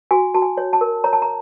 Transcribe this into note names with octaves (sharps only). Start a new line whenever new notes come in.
F#4 G#5
F#4 A5
G#5
C#5
A5
A#4
C#5 A#5
A5
A#5